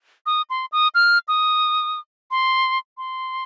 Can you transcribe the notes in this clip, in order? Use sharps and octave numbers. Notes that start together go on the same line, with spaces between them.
D#6
C6
D#6
F6
D#6
C6
C6